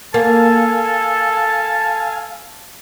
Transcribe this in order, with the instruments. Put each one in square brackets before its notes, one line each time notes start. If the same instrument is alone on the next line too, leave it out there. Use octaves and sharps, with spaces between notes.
[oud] A#3 [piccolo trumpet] A4 [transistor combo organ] F5 G#5 [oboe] A5